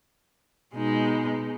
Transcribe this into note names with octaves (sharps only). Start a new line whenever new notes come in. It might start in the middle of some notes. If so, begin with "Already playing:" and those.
B2 G#3 D#4